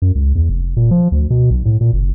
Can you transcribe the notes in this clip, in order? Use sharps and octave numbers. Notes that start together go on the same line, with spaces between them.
F#2
C#2
E2
F1
A#2
F3
D2
B2
B1
A2
A#2
F#1